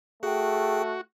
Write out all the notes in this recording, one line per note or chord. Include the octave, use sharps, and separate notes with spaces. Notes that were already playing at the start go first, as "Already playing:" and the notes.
A3 F#4 G#4 G5